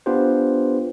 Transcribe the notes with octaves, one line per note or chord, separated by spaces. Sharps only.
B3 D4 F4 G4 B4 C5